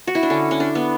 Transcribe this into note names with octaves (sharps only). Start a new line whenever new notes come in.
F#4
E4
D4
D3 C#4
C#4
D4
B3